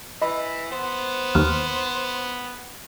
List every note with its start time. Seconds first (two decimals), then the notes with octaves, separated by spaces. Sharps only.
0.22 E3 D#5 B5
0.72 B3 C5
1.35 D#2 F6